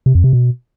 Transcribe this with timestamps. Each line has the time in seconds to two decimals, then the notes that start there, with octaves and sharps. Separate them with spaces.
0.06 C3
0.15 F2
0.24 C3
0.33 B2